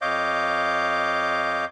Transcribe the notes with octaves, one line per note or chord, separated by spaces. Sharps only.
F2 C#5 D#5 F5 D6 G6